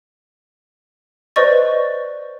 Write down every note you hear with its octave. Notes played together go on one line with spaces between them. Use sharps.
B4 C5 D5 D#5 C#6 A6